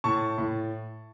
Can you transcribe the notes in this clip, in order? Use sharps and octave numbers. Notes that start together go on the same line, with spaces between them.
A2 A5 C#6
A2